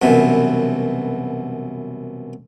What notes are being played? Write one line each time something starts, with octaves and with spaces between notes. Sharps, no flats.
C2 F#2 B2 E3